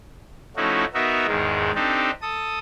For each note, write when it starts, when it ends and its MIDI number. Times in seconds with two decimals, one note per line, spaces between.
0.57 0.85 53
0.57 0.85 57
0.57 0.85 61
0.57 0.85 63
0.57 0.85 64
0.57 0.85 66
0.94 1.26 59
0.94 1.26 63
0.94 1.26 66
0.94 1.26 70
0.94 1.26 76
1.27 1.72 40
1.27 1.72 44
1.27 1.72 51
1.27 1.72 56
1.75 2.11 60
1.75 2.11 62
1.75 2.11 63
1.75 2.11 67
1.75 2.11 69
2.22 2.59 69
2.22 2.59 87